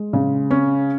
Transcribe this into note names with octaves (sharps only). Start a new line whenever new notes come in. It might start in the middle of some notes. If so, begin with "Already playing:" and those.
Already playing: G#3
C#3
C#4